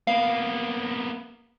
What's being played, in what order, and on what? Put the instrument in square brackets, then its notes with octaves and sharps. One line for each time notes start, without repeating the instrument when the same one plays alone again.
[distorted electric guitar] A#3 B3 [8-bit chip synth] F5